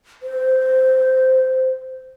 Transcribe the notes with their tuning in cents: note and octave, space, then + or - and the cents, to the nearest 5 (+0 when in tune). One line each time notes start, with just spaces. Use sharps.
C5 -10